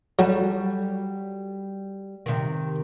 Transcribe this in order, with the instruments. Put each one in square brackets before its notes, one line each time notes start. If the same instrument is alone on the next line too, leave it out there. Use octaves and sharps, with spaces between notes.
[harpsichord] F#3 [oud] G3 F#4 A4
[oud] C3 D#3